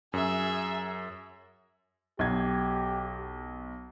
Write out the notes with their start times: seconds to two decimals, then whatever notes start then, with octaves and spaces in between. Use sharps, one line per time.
0.13 F#2 G#4 E5
2.19 B1 G4 G#6